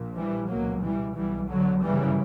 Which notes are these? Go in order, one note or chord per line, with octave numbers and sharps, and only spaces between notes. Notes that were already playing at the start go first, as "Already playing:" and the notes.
Already playing: A#1 A#2
E3 G3
C#2 B2 F#3 A#3
E3 G3
B1 B2 E3 G3
D3 F#3
G1 F#2 C#3 E3 G3